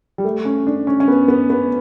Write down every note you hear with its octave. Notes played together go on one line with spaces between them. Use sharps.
G3
A3
C#4
D4
C#4
C#4
B3
B3
B3